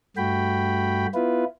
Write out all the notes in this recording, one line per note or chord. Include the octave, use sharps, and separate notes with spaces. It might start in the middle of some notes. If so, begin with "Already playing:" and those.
G2 A3 F#4 G5 B5
B3 E4 F4 B4